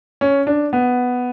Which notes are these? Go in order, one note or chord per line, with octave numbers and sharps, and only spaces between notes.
C#4
D4
B3